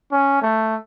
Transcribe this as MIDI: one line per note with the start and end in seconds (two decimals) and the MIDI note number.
0.12 0.37 61
0.42 0.75 57